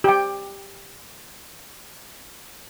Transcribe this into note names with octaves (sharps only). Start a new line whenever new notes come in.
G4 G5